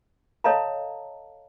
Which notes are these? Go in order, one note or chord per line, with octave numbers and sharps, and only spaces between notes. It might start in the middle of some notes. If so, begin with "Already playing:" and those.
A4 C#5 D#5 F5 A5 A#5